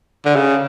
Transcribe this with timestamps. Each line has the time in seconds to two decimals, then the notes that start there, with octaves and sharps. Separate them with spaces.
0.25 D3
0.36 C#3